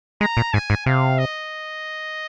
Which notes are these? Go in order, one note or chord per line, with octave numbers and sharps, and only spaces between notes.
G#3 A#5
A#2
G#2 G#5
G#2
C3 F5
D#5